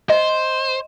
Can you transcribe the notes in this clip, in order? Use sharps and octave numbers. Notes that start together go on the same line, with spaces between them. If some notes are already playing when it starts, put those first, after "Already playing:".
C5 D#5